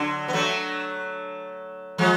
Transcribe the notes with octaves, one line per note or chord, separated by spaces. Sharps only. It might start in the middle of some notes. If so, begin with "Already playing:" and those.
Already playing: D3 F#3
B3
F#3 A3
F3 G#3